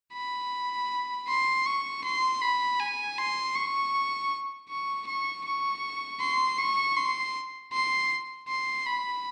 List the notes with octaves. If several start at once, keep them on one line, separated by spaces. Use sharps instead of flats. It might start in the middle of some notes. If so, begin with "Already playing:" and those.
B5
C6
C#6
C6
B5
G#5
C6
C#6
C#6
C#6
C#6
C6
C#6
C6
C6
C6
B5